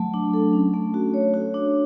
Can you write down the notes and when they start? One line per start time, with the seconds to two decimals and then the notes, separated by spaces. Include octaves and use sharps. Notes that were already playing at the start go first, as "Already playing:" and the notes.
Already playing: F#3 A3
0.14 D4
0.34 A4
0.53 C#4
0.74 A3
0.94 F#4
1.14 C#5
1.34 F#4
1.54 D4